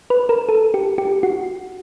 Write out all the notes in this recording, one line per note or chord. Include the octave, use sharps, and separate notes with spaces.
B4
A#4
A4
G4
G4
F#4